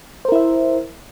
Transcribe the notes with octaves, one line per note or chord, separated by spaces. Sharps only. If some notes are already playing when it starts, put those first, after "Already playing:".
E4 A#4 C5 E5